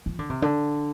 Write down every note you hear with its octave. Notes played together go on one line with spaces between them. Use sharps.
F3
D3
C3
D3